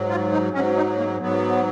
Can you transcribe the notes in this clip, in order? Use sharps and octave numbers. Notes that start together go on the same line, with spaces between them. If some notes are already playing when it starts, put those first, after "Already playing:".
Already playing: G#2 F#3
F4
D#4
G#2 F#3 C#4
D#4
A#3
G#2 F#3 B3